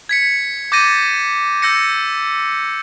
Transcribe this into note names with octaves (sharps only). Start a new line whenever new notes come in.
G#6 B6 C#7
D6 G6 A6 A#6 D#7
E6 G6 A#6 C#7